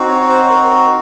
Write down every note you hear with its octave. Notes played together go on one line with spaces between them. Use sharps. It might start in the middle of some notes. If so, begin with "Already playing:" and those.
Already playing: C4 D#4 F#4
C#5
C#5
C5
C5
A#4
A#4